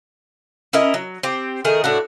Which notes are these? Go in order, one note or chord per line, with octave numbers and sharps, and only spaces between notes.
C#4 E4 A#4 D#5
F#3
C4 G4
D#3 A3 G#4 A#4
A2 D4 F#4